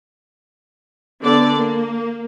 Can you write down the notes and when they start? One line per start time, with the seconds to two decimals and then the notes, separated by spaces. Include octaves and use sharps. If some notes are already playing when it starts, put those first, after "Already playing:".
1.22 D3 B3 D5
1.55 A#3